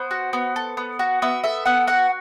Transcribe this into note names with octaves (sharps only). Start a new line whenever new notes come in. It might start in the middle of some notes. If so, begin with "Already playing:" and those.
Already playing: B3 C5
F#4
B3
A4
B3
F#4
B3 E5
A4 E5
B3 F#5
F#4 F#5